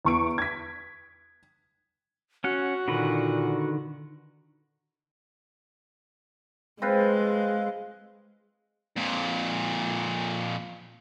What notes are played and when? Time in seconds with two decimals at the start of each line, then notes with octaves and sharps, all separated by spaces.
0.05 E2 C#6 D7
0.38 G#6 B6
2.44 C#4 F#4 F#5
2.88 A#2 D3 D#3 B4
6.82 G#3 C4 F4 B4
8.97 F2 A#2